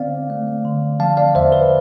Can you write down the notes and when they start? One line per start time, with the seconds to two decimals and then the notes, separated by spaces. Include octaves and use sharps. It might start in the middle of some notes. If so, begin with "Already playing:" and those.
Already playing: D3 C4 D5 F5
0.30 A3
0.65 D3
1.00 F3 F5 A5
1.17 D5 F5
1.35 E2 C5 E5
1.52 B4